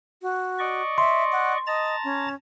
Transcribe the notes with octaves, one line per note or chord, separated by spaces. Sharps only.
F#4
D5 D#5 C#6
E5 C6
F#5
D#5 A5 A#5 A6
C#4